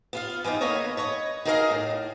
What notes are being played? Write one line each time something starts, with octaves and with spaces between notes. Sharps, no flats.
B3 F4 F5
E3 B3 C4 D#4
A#3 B3 A4 B4 C#5 D#5
B4 C#5 D#5
D#4 F#4 G#4 A#4 D#5 F5
A2